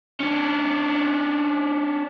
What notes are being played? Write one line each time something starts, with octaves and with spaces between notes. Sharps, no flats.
C#4 D4